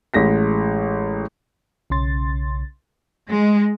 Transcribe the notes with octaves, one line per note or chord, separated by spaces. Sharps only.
A1 G#3 A#6 B6
B1 C#3 C#4 C6 A6
G#3